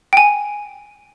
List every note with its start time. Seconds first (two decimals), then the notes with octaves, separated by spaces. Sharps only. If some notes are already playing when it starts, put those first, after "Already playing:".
0.13 G5 G#5